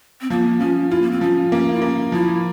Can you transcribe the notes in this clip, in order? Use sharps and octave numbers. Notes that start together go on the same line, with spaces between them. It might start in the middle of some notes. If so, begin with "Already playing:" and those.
C4
F3 A#3
F3 C#4
E4 F4
A#3
C4
F3 C#4
A#3 C#4
E4
A#3 C#4
F3 E4